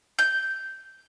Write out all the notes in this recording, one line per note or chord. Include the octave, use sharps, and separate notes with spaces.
G6